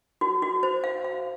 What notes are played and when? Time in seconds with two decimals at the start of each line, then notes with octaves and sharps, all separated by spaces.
0.21 F#4
0.42 F#4
0.63 C5
0.84 F5
1.05 F5